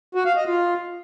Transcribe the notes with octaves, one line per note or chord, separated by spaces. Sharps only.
F#4
F5
D#5
F4